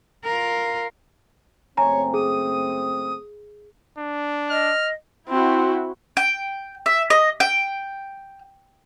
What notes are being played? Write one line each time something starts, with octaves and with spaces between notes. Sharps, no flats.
F4 A#4
F#1 A3 C4 C#5 G#5 A#5
G#4 D#6
D4
D#5 F6
C4 E4 F#4
G5
E5
D#5
G5